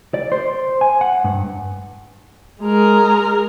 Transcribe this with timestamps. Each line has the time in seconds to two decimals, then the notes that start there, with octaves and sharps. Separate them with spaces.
0.14 D5
0.32 C5
0.81 G#5
1.01 F#5
1.24 G2
2.62 G#3 A#4